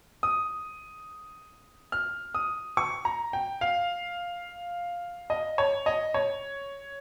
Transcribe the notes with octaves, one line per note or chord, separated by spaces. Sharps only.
D#6
F6
D#6
C#6
A#5
G5
F5
D#5
C#5
D#5
C#5